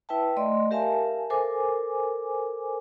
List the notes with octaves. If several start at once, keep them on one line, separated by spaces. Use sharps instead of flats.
E4 B4 E5 G5 A5
A3 D5 D#5 C6
G4 A#4 E5 F5 G#5 A5
A4 A#4 C5 G#5 D6